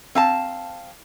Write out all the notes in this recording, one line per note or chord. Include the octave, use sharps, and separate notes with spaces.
C4 F5 A5